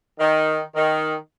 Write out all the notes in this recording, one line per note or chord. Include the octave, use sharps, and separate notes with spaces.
D#3
D#3